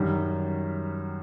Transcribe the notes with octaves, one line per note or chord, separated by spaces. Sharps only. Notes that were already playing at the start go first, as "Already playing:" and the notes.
Already playing: F#2 D#3 G3